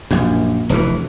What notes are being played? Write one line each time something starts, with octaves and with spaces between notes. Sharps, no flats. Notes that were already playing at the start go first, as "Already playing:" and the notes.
A#1 F#2
F1 D2 A#2 E3